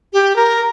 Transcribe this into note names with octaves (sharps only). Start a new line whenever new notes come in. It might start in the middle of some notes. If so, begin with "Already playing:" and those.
G4
A#4